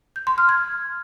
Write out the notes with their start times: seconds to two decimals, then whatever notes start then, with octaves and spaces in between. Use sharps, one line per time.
0.16 G6
0.27 C6
0.38 F6
0.49 G#6